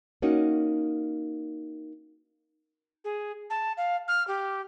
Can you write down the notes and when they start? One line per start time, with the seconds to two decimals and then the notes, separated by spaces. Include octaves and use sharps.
0.22 A#3 C#4 D#4 F#4
3.04 G#4
3.50 A5
3.77 F5
4.08 F6
4.28 G4